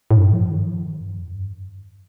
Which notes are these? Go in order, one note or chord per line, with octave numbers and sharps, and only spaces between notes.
A2
G2
F3
D#3
F3
D#3
G2
F2
G2